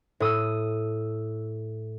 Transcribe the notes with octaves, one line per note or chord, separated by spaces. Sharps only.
A2 D#6 E6